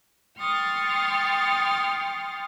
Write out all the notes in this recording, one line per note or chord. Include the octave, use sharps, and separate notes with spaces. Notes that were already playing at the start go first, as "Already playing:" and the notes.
G5 C6 C#6 D#6 F6 A6